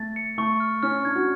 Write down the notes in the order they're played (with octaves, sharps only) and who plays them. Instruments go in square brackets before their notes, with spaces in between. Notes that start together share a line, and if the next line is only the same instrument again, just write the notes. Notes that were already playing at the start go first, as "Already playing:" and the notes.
Already playing: [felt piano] A3 [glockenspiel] A6
[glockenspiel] C#7
[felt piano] A3 [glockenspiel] C#6
[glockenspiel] F6
[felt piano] C#4 [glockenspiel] F6
[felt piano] D4 [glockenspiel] G#6
[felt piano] F#4